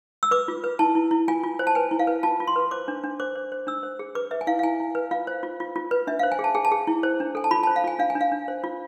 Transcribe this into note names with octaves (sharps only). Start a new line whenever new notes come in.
E6
B4 D6
F4
B4
E4 A5
E4
E4
F4 G#5
F4
C5
A5
B4 G#5
E4
F5
B4
F4 A5
F4
C6
B4
C5 D6
D4
D4
C5 D6
C5
C5
D4 E6
C5
G#4
B4 D6
B4 E5
G#5
E4 F5
F5
E4 G#5
E4
B4
F4 F5
C5
F4
F4
F4
B4
D4 E5
C5 F5
G#5
G#4
A5
G#4 G#5
A5
G#4
E4
C5
D4
A4 G#5
A5
F4 B5
C5 A5
F5
F4 G#5
D4 F5
G#5
D4
F5
D4
C5
F4